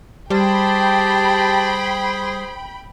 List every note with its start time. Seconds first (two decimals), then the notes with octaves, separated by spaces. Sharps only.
0.30 G3 G4 G#4 C5 G5 A5 B5